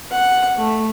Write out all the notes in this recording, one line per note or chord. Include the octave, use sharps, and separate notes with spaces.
F#5
A3